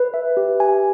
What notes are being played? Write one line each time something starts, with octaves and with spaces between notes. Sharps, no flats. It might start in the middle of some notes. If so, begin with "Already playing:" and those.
Already playing: B4
E5
G4
G#5